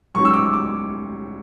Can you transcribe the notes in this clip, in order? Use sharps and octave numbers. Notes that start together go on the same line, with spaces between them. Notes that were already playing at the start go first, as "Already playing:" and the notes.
G#2 F#3 C#4 C#6
E6
D6
D6